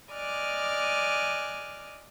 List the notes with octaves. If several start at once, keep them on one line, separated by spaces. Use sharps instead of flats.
D5 D#5 G#5 D6 F6 F#6